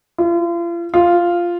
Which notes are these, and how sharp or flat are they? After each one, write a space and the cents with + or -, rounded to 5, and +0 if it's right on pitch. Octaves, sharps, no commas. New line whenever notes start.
F4 -40
F4 -5